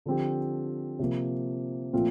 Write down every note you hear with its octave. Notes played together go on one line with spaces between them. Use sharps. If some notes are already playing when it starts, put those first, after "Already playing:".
D3 F3 C4 G4
C3 F3 A#3
A#2 F3 A3 C4 F4